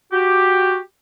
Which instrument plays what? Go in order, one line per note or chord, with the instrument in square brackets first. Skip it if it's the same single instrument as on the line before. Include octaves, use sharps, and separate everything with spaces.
[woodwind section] F#4 G4